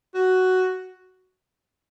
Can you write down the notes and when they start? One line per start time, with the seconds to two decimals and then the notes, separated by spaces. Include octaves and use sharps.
0.14 F#4